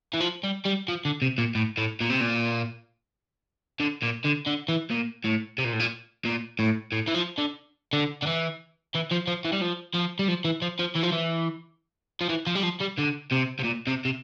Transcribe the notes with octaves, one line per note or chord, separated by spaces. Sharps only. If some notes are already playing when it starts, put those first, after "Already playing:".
E3
F3
G3
G3
F3
D3
C3
A#2
A2
A2
A#2
C3
A#2
D3
A#2
D3
D3
E3
A#2
A2
C3
A#2
A2
A#2
A#2
A2
A2
E3
F3
D3
D3
D3
E3
E3
F3
F3
E3
G3
F3
F3
G3
F3
E3
F3
F3
E3
F3
E3
F3
E3
F3
G3
F3
G3
D3
C3
C3
A#2
C3
C3